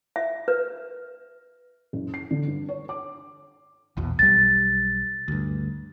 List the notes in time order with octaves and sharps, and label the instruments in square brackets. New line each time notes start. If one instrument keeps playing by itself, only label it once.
[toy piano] E5
B4
[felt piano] F#1
C7
D3
G2
C#5
D6
[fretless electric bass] A#1 E2 B2
[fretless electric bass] B1 G3 [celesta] A6
[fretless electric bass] D2 G2